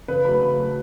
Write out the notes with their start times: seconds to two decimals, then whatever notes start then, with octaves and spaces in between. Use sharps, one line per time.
0.08 C#3 B4
0.25 F#3 A3 B5
0.41 C#3
0.58 F#3 A3